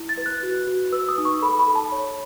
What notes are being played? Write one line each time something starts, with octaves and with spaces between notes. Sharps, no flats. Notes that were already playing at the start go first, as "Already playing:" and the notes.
Already playing: E4
A6
B4
F#6
F#4
F#4
B4 E6
D#6
D#4
C#6
A4 B5
B5
A4
A5
C#5